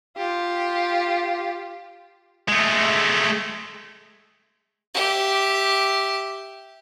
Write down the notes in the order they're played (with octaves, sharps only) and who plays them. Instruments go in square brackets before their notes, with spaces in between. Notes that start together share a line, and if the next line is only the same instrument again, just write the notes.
[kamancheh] F4 G4
[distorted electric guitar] G#3 A3
[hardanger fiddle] G4 E5